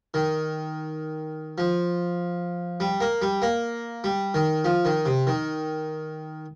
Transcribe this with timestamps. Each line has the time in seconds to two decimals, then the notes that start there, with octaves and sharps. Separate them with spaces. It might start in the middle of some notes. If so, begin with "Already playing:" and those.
0.14 D#3
1.58 F3
2.80 G3
3.00 A#3
3.22 G3
3.42 A#3
4.04 G3
4.34 D#3
4.64 F3
4.85 D#3
5.06 C3
5.27 D#3